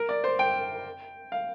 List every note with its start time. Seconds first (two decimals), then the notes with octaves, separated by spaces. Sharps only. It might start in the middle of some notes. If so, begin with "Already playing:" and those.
Already playing: A#4
0.09 D5
0.24 C5
0.39 G5
1.32 F5